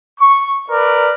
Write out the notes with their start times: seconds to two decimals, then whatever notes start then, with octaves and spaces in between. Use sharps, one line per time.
0.19 C#6
0.70 A#4 B4 D5